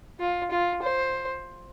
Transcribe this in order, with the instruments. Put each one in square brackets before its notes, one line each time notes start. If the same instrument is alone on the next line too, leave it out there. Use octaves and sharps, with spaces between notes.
[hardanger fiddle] F4
F4
C5